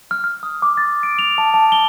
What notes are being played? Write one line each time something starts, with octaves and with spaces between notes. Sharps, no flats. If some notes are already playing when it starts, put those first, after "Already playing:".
F6
F6
D#6
D6
A6
D7
F7
A5
A5
G7